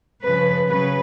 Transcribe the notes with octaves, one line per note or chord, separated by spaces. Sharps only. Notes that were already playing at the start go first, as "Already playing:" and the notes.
C#3 F3 B4
C#3 F#3 B4